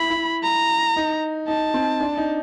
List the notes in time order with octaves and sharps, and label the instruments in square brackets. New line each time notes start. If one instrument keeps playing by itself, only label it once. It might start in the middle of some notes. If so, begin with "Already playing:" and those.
Already playing: [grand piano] E4 [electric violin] B5
[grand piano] E4
[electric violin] A#5
[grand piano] D#4
[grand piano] D#4 [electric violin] A5
[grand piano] C4
D4
D#4